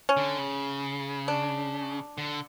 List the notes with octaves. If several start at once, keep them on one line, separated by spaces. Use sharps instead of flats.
C#4
D3
C#3
D4
D3